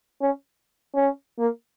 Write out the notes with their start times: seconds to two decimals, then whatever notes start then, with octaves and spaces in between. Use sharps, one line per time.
0.21 C#4
0.94 C#4
1.39 A#3